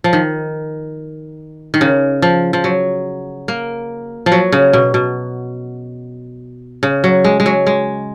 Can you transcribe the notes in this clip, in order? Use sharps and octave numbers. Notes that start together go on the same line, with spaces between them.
F3
D#3
D#3
C#3
F3
F3
F#3
A#3
F3
F#3
C#3
B2
B2
C#3
F#3
G#3
G#3
F#3
G#3